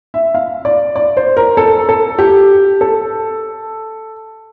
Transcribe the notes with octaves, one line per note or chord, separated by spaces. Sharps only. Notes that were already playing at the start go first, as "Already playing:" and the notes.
E5
F5
D5
D5
C5
A#4
A4
A4
G4
A4